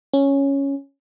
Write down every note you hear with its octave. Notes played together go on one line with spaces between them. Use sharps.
C#4